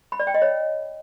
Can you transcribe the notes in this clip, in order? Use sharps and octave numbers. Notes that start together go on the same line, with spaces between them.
B5
D5
G5
D#5
C#5